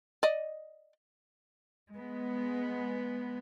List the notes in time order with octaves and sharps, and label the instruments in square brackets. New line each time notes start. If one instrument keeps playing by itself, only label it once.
[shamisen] D5 D#5
[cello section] G#3 B3